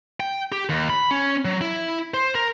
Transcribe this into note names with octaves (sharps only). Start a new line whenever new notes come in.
G5
G4
D#2
B5
C#4
F#3
E4
C5
A#4